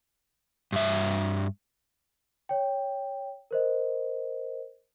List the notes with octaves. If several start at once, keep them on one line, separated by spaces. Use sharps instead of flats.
G2 E5
C#5 G5
A#4 C5 D#5